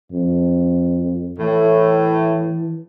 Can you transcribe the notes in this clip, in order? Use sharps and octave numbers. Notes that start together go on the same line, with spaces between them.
F2
A2 E3